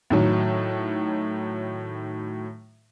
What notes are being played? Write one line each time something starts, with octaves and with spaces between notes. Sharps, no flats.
A2 D#3 F#3